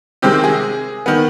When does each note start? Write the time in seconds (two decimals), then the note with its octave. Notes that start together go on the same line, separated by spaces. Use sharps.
0.22 C3 D#3 G#3 C4 G4
0.44 G#4
1.06 D#3 B3